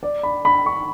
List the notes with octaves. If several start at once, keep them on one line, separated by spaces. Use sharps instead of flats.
D5
B5
B5
C#6